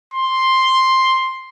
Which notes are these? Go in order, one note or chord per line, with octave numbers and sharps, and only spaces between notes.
C6